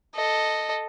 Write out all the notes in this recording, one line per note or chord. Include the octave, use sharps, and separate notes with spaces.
A4 D#5